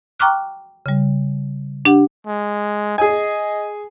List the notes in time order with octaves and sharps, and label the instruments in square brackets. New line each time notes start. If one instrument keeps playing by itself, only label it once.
[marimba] G5 A#5 C#6 D6 F6 F#6
C#3 G3
D4 G4 F#5
[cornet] G#3
[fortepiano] G#4 G#5 [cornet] D#5